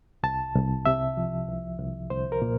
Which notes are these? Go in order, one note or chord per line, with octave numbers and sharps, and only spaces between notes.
C2 A5
C2
C3 E5
F3
C2
C2
C2 C5
A#4
A#2